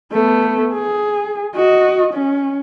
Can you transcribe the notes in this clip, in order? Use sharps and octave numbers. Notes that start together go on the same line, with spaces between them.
A3 B3
G#4
F#4 D#5
C#4